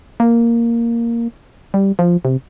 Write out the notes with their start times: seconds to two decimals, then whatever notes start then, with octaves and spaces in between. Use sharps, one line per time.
0.20 A#3
1.74 G3
1.99 F3
2.25 C3